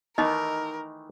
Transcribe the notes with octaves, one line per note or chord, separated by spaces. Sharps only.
D#3 E3 A3 D#4 A#4 D#5